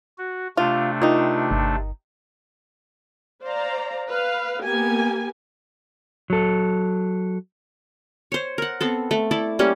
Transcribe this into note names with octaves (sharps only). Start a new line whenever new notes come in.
F#4
C3 A3 D4 F4
D#3 D#4 F4
G1
C5 D5 F5 A#5
B4 F5
A#3 B3 G4 G#5
F#3 A4
C5 C#5
A#4 F#5
B3 C4 A4
A3
E4 A4 D5 A5
G3 A#3 C#4 G4